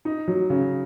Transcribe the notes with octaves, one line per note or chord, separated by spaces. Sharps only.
D#4
F#3
C#3